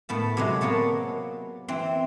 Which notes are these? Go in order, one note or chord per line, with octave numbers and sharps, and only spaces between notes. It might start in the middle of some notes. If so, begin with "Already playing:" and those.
A2 B3 A5
C3 F#3 G#3
A#3 B3 C#5 A5
E3 C4